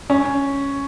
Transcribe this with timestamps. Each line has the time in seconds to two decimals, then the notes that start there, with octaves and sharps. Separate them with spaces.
0.10 C#4